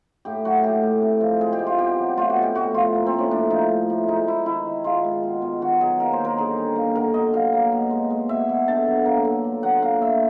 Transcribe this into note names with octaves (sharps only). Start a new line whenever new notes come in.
A2 G4
F#3 F#4
A3 G4
A2
C3
F3
G#3 G#4
G4
C3
F4
B2 G4
F#3
A3 F4
F#4
B2
G4
A2 F#4
F3 F4
A#3
C4
A2
C#4
A2 D4
F3 D#4
A3
A2
G#3 D#4
G#3 E4
D#3 E4
D#3
G#3 F4
G#3
B2
B2
D#3 F#4
F#3 G#4
A#3 A#4
C5
D#3
A#4
D3 G#4
G3
A#3
D3 A#4
B2 D#5
F#3 F5
A#3
B2
G#3
G#3
B2 E5
B2
D3 A5
F#3
A#3
D3
A#2
F#3 F#5
A#3 F5
A#2 E5